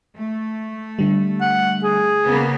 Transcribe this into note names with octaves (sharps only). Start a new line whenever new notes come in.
A3
D3 G3
F#5
G#4
C#3 A#3 B3